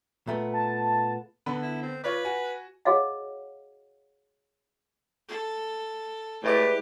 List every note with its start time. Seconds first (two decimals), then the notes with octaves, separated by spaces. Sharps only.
0.27 A#2 A3 B3
0.54 A5
1.46 D3 B3 B5
1.62 E4
1.82 C4
2.04 F4 B4 C#5 D5
2.25 F#4 G#5
2.85 F#4 G#4 C#5 D#5 F5 F#5
5.28 A4
6.44 A2 G#3 E4 G4 B4 D5